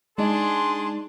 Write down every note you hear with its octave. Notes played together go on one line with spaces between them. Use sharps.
G#3 D4 D#4 G#4 C6